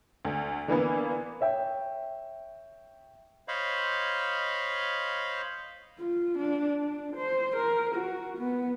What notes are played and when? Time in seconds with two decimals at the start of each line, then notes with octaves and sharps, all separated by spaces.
0.25 D2
0.68 D3 E3 A#3 B3
1.41 C#5 E5 G5
3.48 C5 C#5 D#5 F5 B5
5.98 F4
6.38 D4
6.82 D4
7.16 C5
7.56 A#4
7.95 F#4
8.37 B3